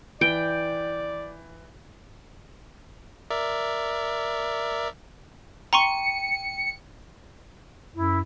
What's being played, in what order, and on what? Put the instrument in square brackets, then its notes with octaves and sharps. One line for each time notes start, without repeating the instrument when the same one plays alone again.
[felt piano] E3 [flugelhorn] D5 [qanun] G5
[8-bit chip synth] A#4 D5 E5
[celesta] G5 D#7 [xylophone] A#5 C6 C#6 [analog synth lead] C#7
[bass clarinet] F#2 [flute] E4